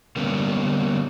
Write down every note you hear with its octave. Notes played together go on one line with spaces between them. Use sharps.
D3 G3 A#3 B3 C#4